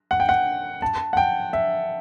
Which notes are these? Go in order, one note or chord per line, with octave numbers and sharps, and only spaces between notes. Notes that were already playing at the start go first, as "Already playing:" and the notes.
F#5
G5
F#5
A5
F#5
G5
E5